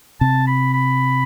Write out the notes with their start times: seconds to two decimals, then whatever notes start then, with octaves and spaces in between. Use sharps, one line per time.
0.21 C3 A5
0.47 B5
0.74 B5